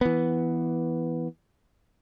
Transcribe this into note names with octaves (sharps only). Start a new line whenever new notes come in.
E3 B3